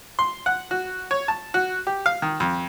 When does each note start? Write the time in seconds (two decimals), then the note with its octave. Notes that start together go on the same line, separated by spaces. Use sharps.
0.19 C6
0.46 F#5
0.71 F#4
1.11 C#5
1.28 A5
1.54 F#4
1.87 G4
2.06 F5
2.22 D#3
2.40 F2